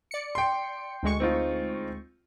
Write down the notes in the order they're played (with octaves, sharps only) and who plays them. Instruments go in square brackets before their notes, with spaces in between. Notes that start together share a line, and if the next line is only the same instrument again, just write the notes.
[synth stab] D5 C#7
[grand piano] G5 C6
[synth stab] D2 G#3 C#6
[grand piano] C4 D#4 F4